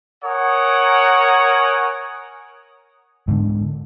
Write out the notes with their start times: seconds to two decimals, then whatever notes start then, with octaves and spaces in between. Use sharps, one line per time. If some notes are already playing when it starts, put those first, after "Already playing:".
0.23 A#4 C#5 F#5 G#5 D#6
3.28 G#2 D3